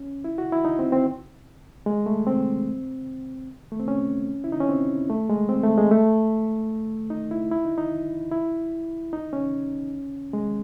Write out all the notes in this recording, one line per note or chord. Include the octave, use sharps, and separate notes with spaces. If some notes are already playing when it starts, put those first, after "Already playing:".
Already playing: C#4
E4
F#4
E4
D#4
C4
C4
G#3
A3
C4
A3
C4
C#4
E4
D#4
C#4
C4
A3
G#3
C4
A3
G#3
A3
D#4
E4
E4
D#4
D#4
E4
D#4
C#4
G#3